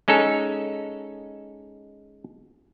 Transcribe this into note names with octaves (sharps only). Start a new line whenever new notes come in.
G#3 C#4 D#4 A4